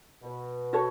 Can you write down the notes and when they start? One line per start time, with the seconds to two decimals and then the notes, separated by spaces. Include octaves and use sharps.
0.22 B2
0.73 F#4 A4 C#5